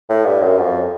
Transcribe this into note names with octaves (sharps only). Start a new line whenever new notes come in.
A2
G2
F#2
F2